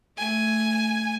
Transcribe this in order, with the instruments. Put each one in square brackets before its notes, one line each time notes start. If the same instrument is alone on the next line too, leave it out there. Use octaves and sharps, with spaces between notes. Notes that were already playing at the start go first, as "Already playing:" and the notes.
[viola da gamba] A3 [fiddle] G#5